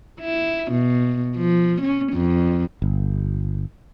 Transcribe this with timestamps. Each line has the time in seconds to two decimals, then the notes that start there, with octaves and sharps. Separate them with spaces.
0.20 E4
0.71 B2
1.36 F3
1.81 C#4
2.12 F2
2.82 G1